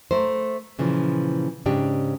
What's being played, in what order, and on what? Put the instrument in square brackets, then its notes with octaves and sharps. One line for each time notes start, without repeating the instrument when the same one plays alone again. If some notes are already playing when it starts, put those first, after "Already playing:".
[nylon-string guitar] A3 A#4 C5
A#2 C#3 E3 F3
G#2 C#3 D4 G4